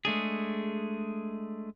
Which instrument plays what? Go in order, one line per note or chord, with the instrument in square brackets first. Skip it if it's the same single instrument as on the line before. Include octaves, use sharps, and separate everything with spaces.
[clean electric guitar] G#3 A3 D4 G#4